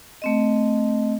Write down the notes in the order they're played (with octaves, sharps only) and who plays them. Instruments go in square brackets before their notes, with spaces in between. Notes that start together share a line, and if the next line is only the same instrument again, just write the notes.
[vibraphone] A3 C4 D#5